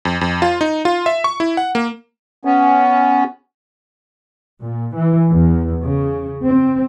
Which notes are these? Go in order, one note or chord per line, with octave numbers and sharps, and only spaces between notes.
F2
F2
F4
D#4
F4
E5
C#6
E4
F#5
A#3
B3 C#4
A#2
E3
E2
C#3
C4